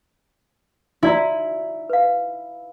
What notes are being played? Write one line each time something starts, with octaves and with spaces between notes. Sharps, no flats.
E4 F#4 D5 A#5
B4 F5